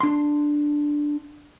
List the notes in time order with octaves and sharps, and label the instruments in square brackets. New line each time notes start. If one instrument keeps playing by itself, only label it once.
[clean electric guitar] D4 C6